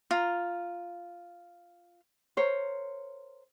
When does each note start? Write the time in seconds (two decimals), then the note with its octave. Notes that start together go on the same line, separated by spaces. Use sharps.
0.11 F4 A#5
2.37 A#4 C5 C#5